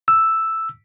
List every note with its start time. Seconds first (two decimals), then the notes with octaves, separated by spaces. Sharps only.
0.08 E6